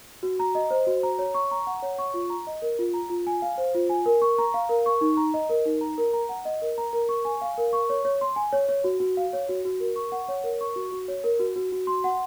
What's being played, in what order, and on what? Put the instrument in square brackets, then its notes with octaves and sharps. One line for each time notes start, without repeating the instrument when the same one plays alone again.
[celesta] F#4
A#5
D#5
C5
F#4
A#5
C#5
C#6
A#5
F#5
C#5
C#6
F4
A#5
D#5
A#4
F4
A#5
F4
G#5
F5
C5
F4
G#5
A#4
C#6
A#5
F5
A#4
C#6
D#4
A#5
D#5
A#4
D#4
A#5
A#4
A#5
F#5
D#5
A#4
A#5
A#4
C#6
G#5
F5
A#4
C#6
C#5
C#5
C6
G#5
C#5
C#5
F#4
F#4
F5
C#5
F#4
F#4
A#4
C#6
F#5
C#5
A#4
C#6
F#4
F#4
C#5
A#4
F#4
F#4
F#4
C6
F#5